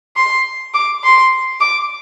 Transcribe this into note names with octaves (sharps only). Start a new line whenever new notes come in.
C6
D6
C6
D6